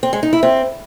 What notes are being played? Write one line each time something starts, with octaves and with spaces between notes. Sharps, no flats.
C4
G#3
D#4
E4
C4